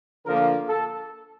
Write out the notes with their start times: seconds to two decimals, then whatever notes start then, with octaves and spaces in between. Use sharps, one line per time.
0.25 D3 F3 A#3 A#4
0.69 A4